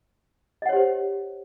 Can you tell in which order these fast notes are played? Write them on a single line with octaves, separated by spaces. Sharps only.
D#5 F#5 C#5 G4 C5